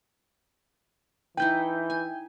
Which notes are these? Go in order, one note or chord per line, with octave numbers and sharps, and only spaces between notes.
E3 D#4 E4 B4 G5 G6
G#5